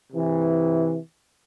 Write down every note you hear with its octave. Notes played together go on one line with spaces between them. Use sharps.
C3 E3